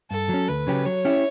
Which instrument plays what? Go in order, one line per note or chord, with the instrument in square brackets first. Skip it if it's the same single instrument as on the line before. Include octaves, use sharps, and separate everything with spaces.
[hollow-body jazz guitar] G2 [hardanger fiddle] A4
[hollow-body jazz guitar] F#3 C#4
[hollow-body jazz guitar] D2 [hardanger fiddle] B4
[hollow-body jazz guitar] C#3 F#3 C#4 G4
[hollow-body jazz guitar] F#3 [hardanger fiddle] C#5
[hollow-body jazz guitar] C#4 E4 G4